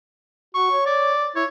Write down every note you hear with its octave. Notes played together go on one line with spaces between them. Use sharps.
F#4 C#6
C#5
D5
E4 C#5